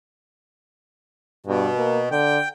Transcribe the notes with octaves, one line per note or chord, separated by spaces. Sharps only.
G2 B2
A#3
D3 G5